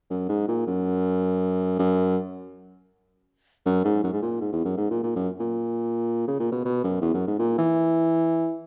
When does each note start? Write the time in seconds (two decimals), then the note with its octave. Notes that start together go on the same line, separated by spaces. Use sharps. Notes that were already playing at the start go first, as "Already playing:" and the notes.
0.10 F#2
0.29 G#2
0.48 A#2
0.67 F#2
1.79 F#2
3.66 F#2
3.85 G#2
4.04 F#2
4.13 G#2
4.22 A#2
4.41 G#2
4.52 E2
4.65 F#2
4.77 G#2
4.91 A#2
5.03 A#2
5.16 F#2
5.40 A#2
6.27 C#3
6.40 A#2
6.52 B2
6.65 B2
6.84 F#2
7.02 E2
7.14 F#2
7.27 G#2
7.39 A#2
7.58 E3